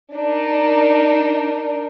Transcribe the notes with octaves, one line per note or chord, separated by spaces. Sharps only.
D4 D#4 A#4